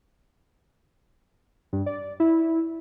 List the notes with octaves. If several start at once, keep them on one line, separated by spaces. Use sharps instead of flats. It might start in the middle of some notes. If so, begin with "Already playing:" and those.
G2
D5
E4